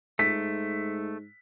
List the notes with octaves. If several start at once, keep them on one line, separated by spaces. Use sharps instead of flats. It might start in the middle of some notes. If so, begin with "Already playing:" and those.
G#2 A3 B6